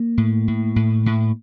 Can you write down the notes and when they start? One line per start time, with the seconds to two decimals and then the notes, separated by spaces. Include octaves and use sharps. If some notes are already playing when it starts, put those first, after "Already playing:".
Already playing: A#3
0.18 A2
0.48 A2
0.76 A2
1.06 A2